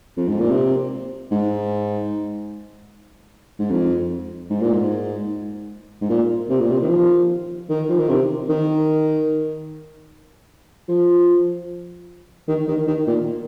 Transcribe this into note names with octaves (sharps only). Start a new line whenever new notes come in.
F2
G#2
A#2
C3
G#2
G#2
F2
G#2
A#2
G#2
G#2
A#2
C3
A#2
C3
D#3
F3
D#3
F3
D#3
C3
D#3
F3
D#3
D#3
D#3
A#2